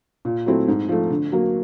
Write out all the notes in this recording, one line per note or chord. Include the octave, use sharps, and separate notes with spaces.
A#2
F#3 A3 C4 E4
G#2
F3 A3
D3
F#3 A#3